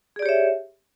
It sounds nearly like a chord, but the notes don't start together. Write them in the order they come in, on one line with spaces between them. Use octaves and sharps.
G#4 D5 G4 C#5 E5